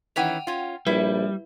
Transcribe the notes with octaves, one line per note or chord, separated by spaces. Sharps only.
D#3 E3 C#4 F#5 G5 F7
C#4 F4
A#1 G3 E4 B4